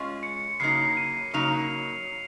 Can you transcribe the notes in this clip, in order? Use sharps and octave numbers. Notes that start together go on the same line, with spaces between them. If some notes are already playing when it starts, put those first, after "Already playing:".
Already playing: G#3 C#4 F4 G#4 D#5
C#7
C#3 F#3 A#3 D#4 C7
D#7
C#3 F#3 A#3 D#4 F7